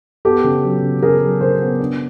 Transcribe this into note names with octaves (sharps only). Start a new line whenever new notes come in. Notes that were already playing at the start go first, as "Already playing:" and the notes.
B3 G4 A4
C#3
F#3
C#3
C#3 G#4 A#4
F#3
C#3 A#4 C5
B3
D4